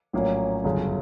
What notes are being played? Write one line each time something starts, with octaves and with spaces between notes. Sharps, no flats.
A#1 A2 F#3 A#3 C#4
G1 F#2 C#3